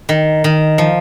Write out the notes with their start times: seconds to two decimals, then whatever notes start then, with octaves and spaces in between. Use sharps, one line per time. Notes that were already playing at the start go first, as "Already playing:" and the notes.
0.09 D#3
0.44 D#3
0.78 F3